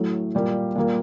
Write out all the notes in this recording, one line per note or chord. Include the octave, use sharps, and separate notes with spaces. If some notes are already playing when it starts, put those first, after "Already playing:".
Already playing: A2 F#3 A3
A#2 G3 A#3
A#2 G3 A#3